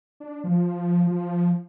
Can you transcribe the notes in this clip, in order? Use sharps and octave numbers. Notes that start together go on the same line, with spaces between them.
D4
F3
F3